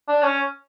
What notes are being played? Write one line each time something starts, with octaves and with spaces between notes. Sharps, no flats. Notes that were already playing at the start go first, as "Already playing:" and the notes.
D4
C#4